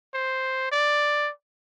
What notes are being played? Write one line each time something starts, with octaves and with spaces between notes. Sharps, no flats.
C5
D5